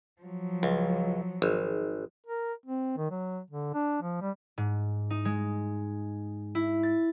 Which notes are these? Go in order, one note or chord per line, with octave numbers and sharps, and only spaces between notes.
F3 F#3
C#2
G#1
A#4
C4
D#3
F#3
D3
D4
F3
G3
G#2
D#4
G#3
E4
A6